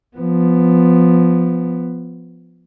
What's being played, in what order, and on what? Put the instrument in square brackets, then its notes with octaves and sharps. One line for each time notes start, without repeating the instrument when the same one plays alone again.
[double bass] F3 B3